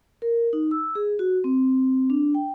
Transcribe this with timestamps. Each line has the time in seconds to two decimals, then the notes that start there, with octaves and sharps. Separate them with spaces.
0.22 A#4
0.53 D#4
0.71 E6
0.95 G#4
1.19 F#4
1.44 C4
2.10 D4
2.35 G5